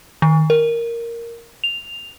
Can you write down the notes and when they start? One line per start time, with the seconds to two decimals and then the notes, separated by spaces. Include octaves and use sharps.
0.22 D#3
0.50 A#4
1.64 F7